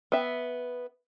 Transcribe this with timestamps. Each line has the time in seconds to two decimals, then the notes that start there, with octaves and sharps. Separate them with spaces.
0.12 B3 E5